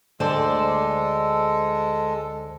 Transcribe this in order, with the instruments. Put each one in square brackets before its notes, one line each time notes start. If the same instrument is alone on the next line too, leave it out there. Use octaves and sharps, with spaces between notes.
[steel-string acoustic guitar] D2 C5 D5 [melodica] G#3 A4